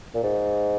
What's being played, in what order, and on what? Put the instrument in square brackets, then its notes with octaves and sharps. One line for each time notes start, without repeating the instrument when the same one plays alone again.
[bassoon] A#2
G#2